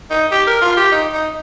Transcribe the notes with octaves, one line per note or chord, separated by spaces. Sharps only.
D#4
G4
A#4
F4
G4
D#4
D#4